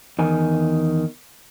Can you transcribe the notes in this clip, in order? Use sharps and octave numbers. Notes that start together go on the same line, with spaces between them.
E2 D#3 G#5